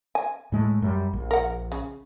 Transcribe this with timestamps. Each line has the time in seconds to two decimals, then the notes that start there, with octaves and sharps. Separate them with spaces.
0.15 G#5
0.52 A2 G#3 A3
0.82 F#2 G3
1.13 A#1
1.31 A#4 F#5
1.72 C#3